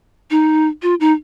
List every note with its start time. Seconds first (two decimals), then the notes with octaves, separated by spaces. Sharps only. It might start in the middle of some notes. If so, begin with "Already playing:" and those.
0.30 D#4
0.82 F4
1.00 D#4